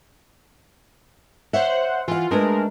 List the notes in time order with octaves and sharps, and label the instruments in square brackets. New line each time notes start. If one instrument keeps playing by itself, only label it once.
[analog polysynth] C5 F#5 [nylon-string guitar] C#5 E5
[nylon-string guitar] E3 F#5 [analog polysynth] F4
[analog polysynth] G#3 A#4 [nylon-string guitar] A3 D4 B4